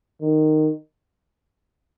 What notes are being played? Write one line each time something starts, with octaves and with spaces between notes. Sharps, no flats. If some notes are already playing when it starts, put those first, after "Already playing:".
D#3